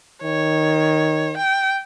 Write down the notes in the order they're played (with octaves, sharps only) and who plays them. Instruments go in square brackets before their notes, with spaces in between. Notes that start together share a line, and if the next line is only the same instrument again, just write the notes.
[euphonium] D#3 [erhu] C#5
[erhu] G5